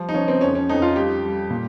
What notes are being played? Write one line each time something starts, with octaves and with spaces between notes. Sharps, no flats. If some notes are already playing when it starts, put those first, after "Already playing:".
Already playing: F3 G3
D#4
F3 C#4
C4
F2 C#4
C#4
F2 D#4
F4
G3 G4
G3
A#2